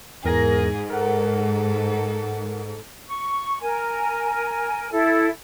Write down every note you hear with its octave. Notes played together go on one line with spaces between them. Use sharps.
E2 G#2 G#4 A#4 A#6
A4 A#4 F#5
C#6
A#4 G#5
E4 A4